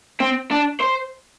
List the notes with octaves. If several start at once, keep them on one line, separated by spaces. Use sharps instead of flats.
C4
D4
C5